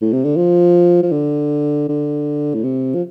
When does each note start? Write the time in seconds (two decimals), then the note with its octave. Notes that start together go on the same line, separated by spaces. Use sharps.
0.02 A2
0.13 C3
0.25 D3
0.36 F3
1.03 F3
1.12 D3
1.89 D3
2.54 A2
2.64 C3
2.95 F3